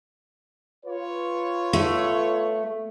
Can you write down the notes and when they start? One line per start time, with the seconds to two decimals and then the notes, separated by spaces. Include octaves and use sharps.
0.86 F4 B4 C#5
1.73 A3